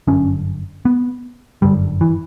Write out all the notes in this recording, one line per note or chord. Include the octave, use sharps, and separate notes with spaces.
G1 F#2 D3 C#4
B3
G1 F#2 D3 G3
E3